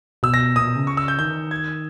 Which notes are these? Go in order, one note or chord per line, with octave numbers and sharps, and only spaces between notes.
B2 E6
A#6
A#2 D#6
B2
C#3
C#6
E6
G6
D#3 G6
G#6